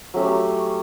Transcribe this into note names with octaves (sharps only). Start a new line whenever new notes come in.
F#3 A3 C#4 G4